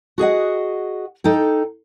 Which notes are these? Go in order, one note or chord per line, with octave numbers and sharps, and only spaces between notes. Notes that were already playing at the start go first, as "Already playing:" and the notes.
F#4 G#4 D#5 F#5
D#4 A4 G5